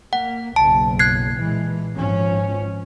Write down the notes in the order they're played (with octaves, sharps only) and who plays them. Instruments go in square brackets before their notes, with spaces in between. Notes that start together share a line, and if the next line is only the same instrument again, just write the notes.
[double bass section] A#3 [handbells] F#5
[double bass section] F#1 B1 [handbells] A5
[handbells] F#6 G#6 C7
[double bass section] A#2 E3 G#3
G#1 F3 C#4